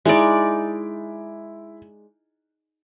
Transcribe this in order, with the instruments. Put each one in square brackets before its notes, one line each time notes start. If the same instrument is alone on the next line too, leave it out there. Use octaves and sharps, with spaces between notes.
[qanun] G#3 D#4 D5 [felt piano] E4 D7